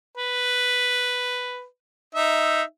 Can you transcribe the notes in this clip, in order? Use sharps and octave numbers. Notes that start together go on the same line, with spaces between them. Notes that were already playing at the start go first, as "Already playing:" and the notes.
B4
D#4 E5